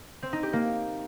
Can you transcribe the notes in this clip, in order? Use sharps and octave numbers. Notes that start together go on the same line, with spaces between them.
C4
D#4
G4
A#3